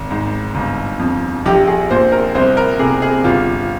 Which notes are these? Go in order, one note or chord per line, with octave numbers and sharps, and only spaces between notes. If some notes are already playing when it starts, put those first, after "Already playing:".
Already playing: G#1
G#2
G1
F2
A#1 G4
G#4
A#2 C5
A#4
C2 C5
A#4
C3 G#4
G#4
G1 F4